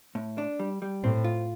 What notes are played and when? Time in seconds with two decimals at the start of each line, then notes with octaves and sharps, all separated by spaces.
0.15 A2
0.38 D4
0.59 G3
0.82 G3
1.04 A2 C4
1.24 F4